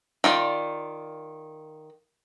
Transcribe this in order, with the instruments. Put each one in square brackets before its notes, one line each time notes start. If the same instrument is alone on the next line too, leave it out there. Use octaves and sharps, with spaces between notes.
[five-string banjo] D#3 F4 D5